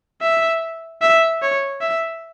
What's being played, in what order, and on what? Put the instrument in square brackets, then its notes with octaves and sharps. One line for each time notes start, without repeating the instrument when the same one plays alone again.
[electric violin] E5
E5
C#5
E5